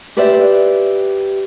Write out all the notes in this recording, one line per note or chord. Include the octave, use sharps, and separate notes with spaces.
G4 B4 C5 D5 E5